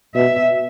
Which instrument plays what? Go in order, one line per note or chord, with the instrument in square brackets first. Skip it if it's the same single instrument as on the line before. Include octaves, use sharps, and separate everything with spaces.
[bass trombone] B2 [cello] E5